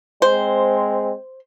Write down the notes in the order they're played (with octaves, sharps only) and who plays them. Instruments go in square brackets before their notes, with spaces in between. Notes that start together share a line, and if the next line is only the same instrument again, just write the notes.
[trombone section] G#3 C4 [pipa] C5